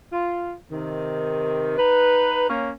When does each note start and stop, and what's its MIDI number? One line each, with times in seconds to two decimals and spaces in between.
0.12 0.55 65
0.71 1.76 48
0.71 1.76 51
1.78 2.47 63
1.78 2.47 71
2.48 2.70 58
2.48 2.70 61